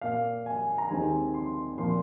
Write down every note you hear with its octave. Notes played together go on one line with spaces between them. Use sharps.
A#2 A#3 F5
G#5
A#5
D#2 D#3 G#3 C4 G#5
C6
A#2 F3 A#3 C6